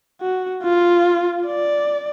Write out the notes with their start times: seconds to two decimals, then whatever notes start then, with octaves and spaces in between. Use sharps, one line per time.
0.21 F#4
0.63 F4
1.47 D5